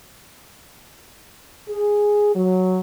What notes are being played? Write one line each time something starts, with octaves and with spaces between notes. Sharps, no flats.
G#4
F#3